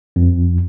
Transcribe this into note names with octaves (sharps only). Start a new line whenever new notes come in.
F2